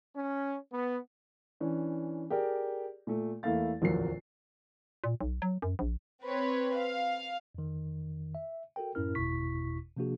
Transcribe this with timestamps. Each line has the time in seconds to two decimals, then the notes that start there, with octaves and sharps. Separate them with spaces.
0.16 C#4
0.73 B3
1.60 E3 C#4 D4
2.30 G4 G#4 A#4 D5
3.07 A#2 A3
3.43 E2 A3 A#3 E4 F5 A6
3.81 D1 A#1 E2 F#3 A#4 C7
5.04 A#2
5.21 B1
5.42 F#3
5.62 F#2
5.79 A#1
6.23 C4 B4 C#5
6.75 F5
7.55 F2 D#3
8.35 E5
8.76 F#4 A4 A#4 G5
8.95 F#2 A2 C#4 E4 A#4 F6
9.15 G1 E2 B2 E4 C#6 B6
9.97 C3 F3 A#3 D4 F#4 G#4